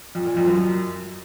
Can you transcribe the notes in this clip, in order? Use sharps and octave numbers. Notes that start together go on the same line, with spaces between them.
F2
A#2
F2
F#2